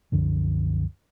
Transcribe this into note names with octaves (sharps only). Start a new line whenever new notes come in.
C2 F#2 D3 F3